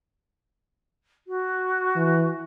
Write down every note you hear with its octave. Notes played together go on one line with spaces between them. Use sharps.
F#4
E3